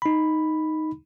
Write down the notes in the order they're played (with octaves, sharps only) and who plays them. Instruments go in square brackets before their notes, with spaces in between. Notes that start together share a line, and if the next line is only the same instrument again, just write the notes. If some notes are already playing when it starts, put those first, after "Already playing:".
[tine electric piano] D#4 B5